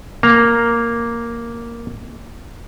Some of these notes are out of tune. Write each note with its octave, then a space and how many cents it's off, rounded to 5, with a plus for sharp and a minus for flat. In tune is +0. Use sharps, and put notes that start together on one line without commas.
A#3 +0 A#5 +0